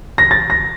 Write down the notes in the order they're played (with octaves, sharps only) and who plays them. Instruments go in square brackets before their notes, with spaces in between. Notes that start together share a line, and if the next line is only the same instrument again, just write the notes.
[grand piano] A#6
A6
A#6